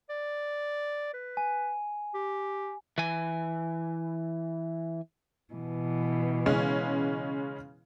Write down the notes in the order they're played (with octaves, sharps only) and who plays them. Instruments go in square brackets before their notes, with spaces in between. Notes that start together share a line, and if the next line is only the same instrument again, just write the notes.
[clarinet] D5
B4
[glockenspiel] G#5
[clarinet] G4
[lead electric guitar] E3 G#5
[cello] B2 E3
[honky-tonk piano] C#3 G#3 C#4